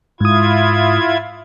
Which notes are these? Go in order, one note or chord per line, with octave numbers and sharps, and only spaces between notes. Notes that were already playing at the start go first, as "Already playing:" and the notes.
G#2 E4 F4 D#6 G#6